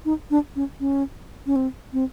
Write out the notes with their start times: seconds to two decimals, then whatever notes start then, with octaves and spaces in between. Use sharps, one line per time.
0.05 D#4
0.31 D4
0.56 C#4
0.80 C#4
1.46 C#4
1.56 C4
1.93 C4